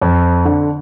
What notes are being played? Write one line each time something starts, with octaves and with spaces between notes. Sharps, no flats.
F2
D3